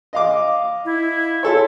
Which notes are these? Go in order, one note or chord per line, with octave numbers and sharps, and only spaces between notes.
D#5 F5 D6
E4
F4 A4 C#5